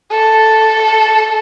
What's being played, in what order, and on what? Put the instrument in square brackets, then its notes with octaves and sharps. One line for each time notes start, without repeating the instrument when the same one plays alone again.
[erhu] A4